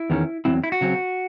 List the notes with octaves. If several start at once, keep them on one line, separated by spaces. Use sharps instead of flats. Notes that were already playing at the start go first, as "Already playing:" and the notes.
Already playing: E4
E2 D#3 G#3 C#4
E2 D#3 F#3 C4 E4
E4
F#4
C#3 F#3 C4